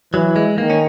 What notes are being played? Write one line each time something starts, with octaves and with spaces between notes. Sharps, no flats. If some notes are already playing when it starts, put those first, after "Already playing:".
E3 F#3
G#3
D#3 A#3
C#4